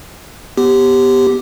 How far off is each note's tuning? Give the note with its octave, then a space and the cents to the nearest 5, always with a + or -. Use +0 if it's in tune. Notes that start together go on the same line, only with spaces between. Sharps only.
B3 +0 G4 +0